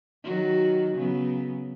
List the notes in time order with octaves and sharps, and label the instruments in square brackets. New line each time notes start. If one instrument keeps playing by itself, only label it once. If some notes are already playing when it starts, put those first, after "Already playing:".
[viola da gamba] D#3 F#3 F#4
C#3 F#3 B3